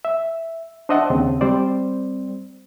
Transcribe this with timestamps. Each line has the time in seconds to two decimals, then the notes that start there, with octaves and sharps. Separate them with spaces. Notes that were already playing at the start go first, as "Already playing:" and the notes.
0.05 E5
0.89 D4 C5 D#5 E5 F#5 A5
1.10 D#2 C#3 C4
1.41 G3 C4 C5 D5